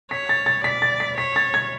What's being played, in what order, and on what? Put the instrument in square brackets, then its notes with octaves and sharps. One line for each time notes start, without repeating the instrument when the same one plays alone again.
[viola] C#5 [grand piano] B6
[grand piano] A6
A6
[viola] D5 [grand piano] B6
[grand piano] A6
B6
[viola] C#5 [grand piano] B6
[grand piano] A6
G#6